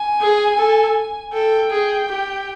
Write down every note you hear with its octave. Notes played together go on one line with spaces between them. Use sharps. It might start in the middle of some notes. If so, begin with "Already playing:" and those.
Already playing: G#5
G#4
A4
A4 G5
G#4
G4